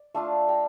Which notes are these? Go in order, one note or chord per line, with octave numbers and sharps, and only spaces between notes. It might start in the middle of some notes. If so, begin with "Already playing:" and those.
Already playing: D5
A3 D4 F4 F5 A5
G5 A#5